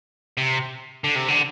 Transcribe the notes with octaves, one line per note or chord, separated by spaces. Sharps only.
C3
D3
C3
D3